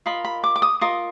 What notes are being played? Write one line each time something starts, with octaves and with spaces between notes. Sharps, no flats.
F4 A#4 D#5 B5
B5
D6
D6
D#6
F4 A#4 D#5 D#6